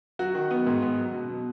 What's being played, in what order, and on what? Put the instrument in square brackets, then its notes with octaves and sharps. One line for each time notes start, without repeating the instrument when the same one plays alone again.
[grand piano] F#3 F#4
D#3
B3
G#2
B3
F#3
B2
B2